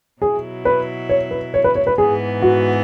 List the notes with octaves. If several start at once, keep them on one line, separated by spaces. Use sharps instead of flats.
B2 F#3 E4 G#4
B4
C#5
B4
C#5
B4
C#5
B4
G#2 E3 B3 G#4
F#4